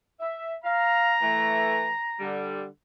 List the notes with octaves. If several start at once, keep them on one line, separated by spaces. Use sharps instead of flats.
E5
F5 A#5
E3 A3
D3 G3